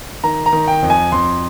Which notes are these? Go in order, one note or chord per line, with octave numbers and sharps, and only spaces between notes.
D#3 A#5
A#5
D#3
G5
F2
G#5
F2 C6